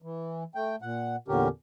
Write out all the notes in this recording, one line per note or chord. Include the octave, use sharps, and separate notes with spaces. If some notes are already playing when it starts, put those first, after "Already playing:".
E3
A3 G5
A#2 F#5
E2 A#2 D3 C#4 G4 A#4